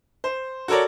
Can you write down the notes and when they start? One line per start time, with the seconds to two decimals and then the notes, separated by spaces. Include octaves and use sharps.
0.24 C5
0.68 F#4 A4 A#4 C#5 D5